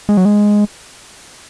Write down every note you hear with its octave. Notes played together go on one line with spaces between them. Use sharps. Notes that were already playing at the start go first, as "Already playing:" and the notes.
G#3
F#3
G#3